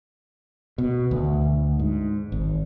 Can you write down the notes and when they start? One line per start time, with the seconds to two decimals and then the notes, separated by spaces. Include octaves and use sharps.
0.78 B2
1.11 D2
1.79 G#2
2.32 G#1